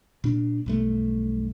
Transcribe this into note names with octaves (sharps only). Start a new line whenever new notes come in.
A#2 D4
B1 G2 A3